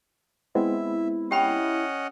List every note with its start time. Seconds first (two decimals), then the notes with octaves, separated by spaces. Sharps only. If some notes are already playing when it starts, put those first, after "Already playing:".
0.55 G#3 B3 C4 E4 E5
1.31 C#4 G4 D#5 F#5 G5 B5